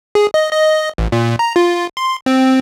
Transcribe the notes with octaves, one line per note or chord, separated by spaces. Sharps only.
G#4
D#5
D#5
A1
A#2
A#5
F4
C6
C4